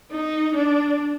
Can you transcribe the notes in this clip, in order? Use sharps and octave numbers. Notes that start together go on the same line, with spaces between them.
D#4
D4